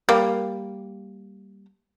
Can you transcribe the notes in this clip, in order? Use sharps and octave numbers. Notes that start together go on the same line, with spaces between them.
G3 A#3